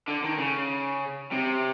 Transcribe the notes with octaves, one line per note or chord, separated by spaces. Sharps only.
D3
D#3
C#3
C3